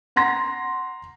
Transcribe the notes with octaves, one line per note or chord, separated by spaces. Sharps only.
F#5 A#5 C6 A#6